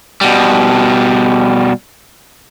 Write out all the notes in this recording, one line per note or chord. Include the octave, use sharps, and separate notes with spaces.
B2 G3